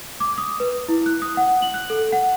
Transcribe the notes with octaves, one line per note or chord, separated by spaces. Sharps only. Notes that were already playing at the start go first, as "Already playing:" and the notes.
D6
D#6
B4
E4
F#6
D#6
F#5
F#7
F#6
A4
F#5